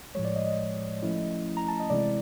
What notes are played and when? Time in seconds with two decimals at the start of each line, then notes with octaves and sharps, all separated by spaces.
0.15 A2 F3 G#3 C#5
0.25 D5
0.36 D#5
0.47 D#5
1.02 F3 A3 C#4 E4
1.57 A#5
1.68 A5
1.80 D#5
1.90 C3 E3 G#3 C4 E4 D5